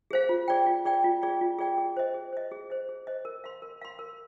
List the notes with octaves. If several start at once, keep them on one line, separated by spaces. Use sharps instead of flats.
G#4 C5 F5
F4
G#4 D5 G5
F4
G#4 D5 G5
F4
G#4 D5 G5
F4
G#4 D5 G5
G#4
C5 D#5
G#4
C5 D#5
G#4
C5 D#5
G#4
C5 D#5
A#4
F5 C6
A#4
F5 C6
A#4